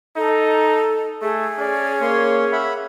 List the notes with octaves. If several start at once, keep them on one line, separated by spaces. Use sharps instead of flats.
D#4 A4
A3 G#4
C#4 D5
A#3 C#5 C6
E5 F#5 B5